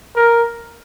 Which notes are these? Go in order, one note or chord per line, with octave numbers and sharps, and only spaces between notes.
A#4